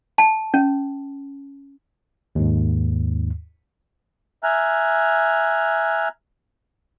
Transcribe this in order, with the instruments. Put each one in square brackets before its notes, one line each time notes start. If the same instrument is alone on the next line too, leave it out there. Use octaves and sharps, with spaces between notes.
[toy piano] A5
C#4
[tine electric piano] D#2 G#2
[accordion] E5 G#5 A#5 F6 F#6